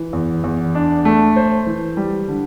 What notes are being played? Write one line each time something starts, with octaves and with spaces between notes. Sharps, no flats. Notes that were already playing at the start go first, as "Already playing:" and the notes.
Already playing: E3
E2
E2
D4
A3
C5
E3
G3
D3